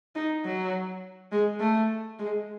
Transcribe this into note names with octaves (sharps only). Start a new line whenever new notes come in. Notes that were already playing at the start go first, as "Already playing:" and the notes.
D#4
F#3
G#3
A3
G#3